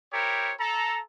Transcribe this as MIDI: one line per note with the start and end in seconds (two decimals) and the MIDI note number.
0.13 0.53 64
0.13 0.53 67
0.13 0.53 70
0.13 0.53 72
0.13 0.53 73
0.59 1.00 69
0.59 1.00 82